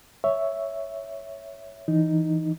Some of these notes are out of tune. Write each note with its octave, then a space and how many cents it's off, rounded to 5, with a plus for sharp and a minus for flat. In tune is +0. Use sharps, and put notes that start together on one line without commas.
C#5 +5 E5 +0
E3 +0 D#4 +0